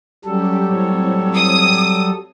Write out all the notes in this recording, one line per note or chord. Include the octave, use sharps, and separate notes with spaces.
F#3 G3 C#4 G4 A4
A2 C4 C#5
D#6